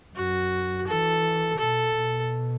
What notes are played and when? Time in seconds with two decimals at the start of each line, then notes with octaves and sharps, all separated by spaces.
0.16 F#2 F#4
0.87 E3 A4
1.58 B2 A4
1.94 B2